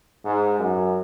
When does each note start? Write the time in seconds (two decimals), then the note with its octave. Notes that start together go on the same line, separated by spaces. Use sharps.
0.25 G#2
0.59 F#2